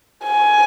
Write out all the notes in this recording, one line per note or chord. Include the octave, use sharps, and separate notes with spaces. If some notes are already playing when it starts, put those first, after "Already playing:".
G#5